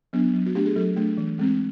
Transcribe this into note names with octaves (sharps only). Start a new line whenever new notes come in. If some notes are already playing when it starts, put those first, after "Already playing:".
F#3 B3 D4
F#3
F#4
A3 D4 G4
G#4
F#3 A4
A3 D4
E3
G#3 C4